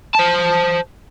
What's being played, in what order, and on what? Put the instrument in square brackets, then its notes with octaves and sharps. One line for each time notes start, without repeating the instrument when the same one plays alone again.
[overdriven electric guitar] C5 A5